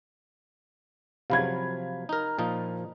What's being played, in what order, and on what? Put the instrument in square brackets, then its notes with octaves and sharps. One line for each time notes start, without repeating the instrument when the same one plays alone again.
[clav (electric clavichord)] C3 F3 F#3 [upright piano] F5 B5 G#6
[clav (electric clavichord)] D#4 A#4
A#2 F3 D#4